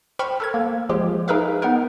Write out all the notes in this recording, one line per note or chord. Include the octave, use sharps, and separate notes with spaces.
C5 G5 B5 C#6 F6 G6
A4 A#4 G#6
A#3
F3 G#3 G4
D#4 G#4 A#4 B4 E5 F5
B3 D#4 A#4